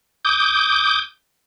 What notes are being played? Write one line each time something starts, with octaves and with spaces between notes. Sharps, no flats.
D6 D#6 G6